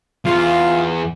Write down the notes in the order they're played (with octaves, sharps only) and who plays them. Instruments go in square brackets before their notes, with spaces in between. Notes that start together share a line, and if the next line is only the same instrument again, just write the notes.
[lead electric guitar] E2 [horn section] F4